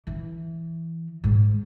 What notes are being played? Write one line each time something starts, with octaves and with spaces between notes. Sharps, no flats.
E3
G#2